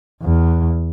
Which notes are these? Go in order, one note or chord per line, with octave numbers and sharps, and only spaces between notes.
E2